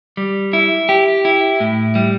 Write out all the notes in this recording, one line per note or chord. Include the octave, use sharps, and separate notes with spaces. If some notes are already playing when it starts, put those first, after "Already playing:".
G3
E4
G4
E4
A2
G3